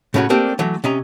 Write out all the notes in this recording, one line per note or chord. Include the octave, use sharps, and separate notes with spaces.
A2 C#3 A3 C#4 F4 F#4
A3 A#3 C4 D4 G4
E3 F#3 A3
C3 C#4 D#5 A#5